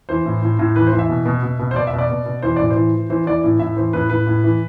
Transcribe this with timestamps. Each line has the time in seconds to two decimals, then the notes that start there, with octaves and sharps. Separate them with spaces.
0.09 E3 C5
0.26 A2
0.42 A2
0.59 A2
0.76 E3 B4
0.87 C5
0.93 E3
0.99 E5
1.09 B2
1.26 B2
1.43 B2
1.59 B2
1.71 C5
1.76 B2 D5
1.87 E5
1.93 B2
1.98 D5
2.10 B2
2.26 B2
2.42 E3 C5
2.56 A2 D5
2.70 C5
2.76 E3
2.93 E3
3.10 E3 C5
3.26 E3 D5
3.44 A2
3.59 A2 E5
3.77 E3 C5
3.93 A2 B4
4.10 A2 B4
4.27 A2
4.44 E3